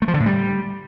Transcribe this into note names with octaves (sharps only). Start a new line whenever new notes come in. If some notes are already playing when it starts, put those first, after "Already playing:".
A3
F3
D3
A2
G3